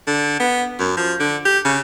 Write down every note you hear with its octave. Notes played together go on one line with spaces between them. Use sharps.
D3
B3
F#2
F3
D3
G4
C#3